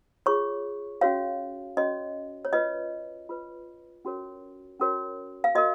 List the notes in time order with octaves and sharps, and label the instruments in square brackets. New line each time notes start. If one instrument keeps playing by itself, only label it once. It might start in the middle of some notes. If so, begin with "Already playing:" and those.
[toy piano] F4 G#4 C#5 C#6
C#4 F#4 C#5 F5
C#4 F#4 C#5 D#5
C#5
F4 B4 D#5
F4 B4
C#4 F#4 A#4 C#5
C#4 F#4 A#4 C#5
F5
F#4 A#4 D#5